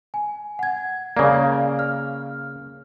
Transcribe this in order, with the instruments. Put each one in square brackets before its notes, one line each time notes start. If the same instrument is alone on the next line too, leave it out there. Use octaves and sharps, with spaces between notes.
[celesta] G#5
F#5 G#6
[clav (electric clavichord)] C#3 A#3 [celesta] D5
[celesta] F6